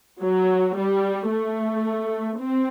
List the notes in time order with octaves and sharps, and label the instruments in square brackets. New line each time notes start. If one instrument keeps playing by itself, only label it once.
[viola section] F#3
G3
A3
C4